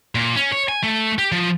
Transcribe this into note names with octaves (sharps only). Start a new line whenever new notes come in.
A#2
C#4
C#5
G#5
A3
G4
F3